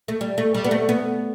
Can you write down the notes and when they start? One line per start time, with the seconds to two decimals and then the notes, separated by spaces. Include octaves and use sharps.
0.08 A3
0.21 G3
0.38 A3
0.54 G3
0.64 B3
0.71 A3
0.89 B3